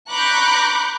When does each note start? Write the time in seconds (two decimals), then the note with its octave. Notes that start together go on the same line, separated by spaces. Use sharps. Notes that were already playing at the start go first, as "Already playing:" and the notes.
0.11 A#5 B5 C#6 D6 F#6 G6